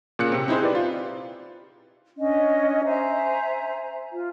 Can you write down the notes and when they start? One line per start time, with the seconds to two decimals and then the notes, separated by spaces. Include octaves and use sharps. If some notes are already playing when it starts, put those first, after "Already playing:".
0.19 A#2 C#3 F#6 C#7
0.32 C3 C4
0.48 C4 D#4 E4 G#4 C5
0.62 G4 B4 D5
0.75 F4
2.17 C#4 D4 D#5
2.85 C5 E5 G#5 A#5
4.12 F4